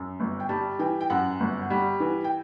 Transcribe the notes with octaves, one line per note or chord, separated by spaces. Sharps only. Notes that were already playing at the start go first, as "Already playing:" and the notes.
Already playing: F#2
G1
G5
G3 A5
E3 G5
G5
F#2 F#5
G1
G3
E3
G5